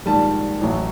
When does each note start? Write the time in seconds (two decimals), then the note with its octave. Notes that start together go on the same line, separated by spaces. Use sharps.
0.06 A#1 G#2 D#3 G3 A5
0.61 A1 A2 F#3